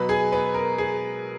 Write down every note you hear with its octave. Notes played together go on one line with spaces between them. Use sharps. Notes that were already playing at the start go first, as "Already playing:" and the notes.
Already playing: B2 F#3 B4 B5
G#4 G#5
B3 B4
A#4
G#4